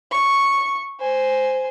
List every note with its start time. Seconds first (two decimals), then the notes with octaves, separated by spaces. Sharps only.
0.11 C#6
1.00 C5 G#5